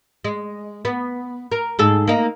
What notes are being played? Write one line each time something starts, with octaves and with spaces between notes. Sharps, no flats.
G#3
B3
A#4
G#2 G#4 A4
A#3 D#4